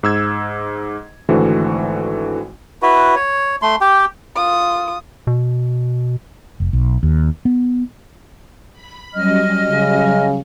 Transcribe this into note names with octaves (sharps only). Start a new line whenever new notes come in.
G#2 E6 G#6
G#1 D3 E3 A3 F#4 C5
E4 F#4 B4
C#5
A3 C6
G4 G5
F4 D#6
B2
F1
B1
D#2
B3
B5
F#3 G3 C#4 D#5 F6
C#3